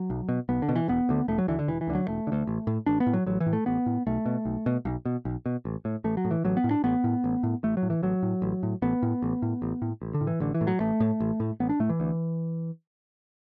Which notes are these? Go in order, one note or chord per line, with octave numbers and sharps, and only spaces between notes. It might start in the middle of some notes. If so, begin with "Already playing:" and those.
Already playing: F#3
B1
B2
B1 B3
D3
B2
E3
E1 B3
D2 D3
E1 A3
F#3
D2 D3 E3
D3
E1 E3
E3
D2 D3
F#3
E1 A3
D3
D2
A1
A2
A1 D4
B3
A2
F#3
A1 F#3
E3
A2
A3
A1 B3
A2
B1 A3
B2
B1
B2
B1
B2
B1
B2
A1
A2
A1 A3
F#3
A2
E3
A1 F#3
B3
A2
D4
A1 B3
A2
A1
A2
A1 A3
F#3
A2
E3
A1 F#3
A2
A1
A2
A1 B3
A2
A1
A2
A1
A2
A1
D3
A2
E3
A1 D3
E3
A2
F#3
A1 A3
A2
A1
A2
A1 B3
D4
A2 A3
E3
D2